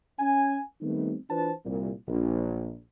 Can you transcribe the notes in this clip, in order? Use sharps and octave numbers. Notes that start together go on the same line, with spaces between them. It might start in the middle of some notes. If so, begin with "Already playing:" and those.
C#4 G#5
D#3 G3 A3 B3 C4 D#4
E3 D4 F4 B4 C5 A5
C2 A#2
A#1